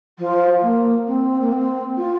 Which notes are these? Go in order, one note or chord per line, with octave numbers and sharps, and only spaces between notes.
F3
A#3
C4
A#3
C4
F4